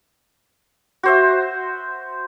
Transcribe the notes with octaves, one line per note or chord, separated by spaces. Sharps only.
F#4 C5 E5